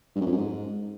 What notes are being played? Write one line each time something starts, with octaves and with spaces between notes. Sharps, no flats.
G2
F#2
F2
F#2
G#2